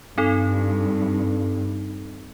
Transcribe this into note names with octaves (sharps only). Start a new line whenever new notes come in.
G2 C4 D#4 A4